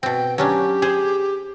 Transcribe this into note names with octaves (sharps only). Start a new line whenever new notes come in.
B2 C4 G5
F#3 C#4 D4 G4
G#4 C5